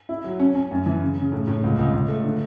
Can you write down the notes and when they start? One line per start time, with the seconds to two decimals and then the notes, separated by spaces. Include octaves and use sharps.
0.09 E4
0.24 F#3
0.39 C#4
0.55 C#4
0.71 F#2
0.86 E3
1.02 C#3
1.17 C#3
1.32 A2
1.47 A2
1.63 C#2
1.79 C#2
1.93 C#2
2.08 A3
2.24 D3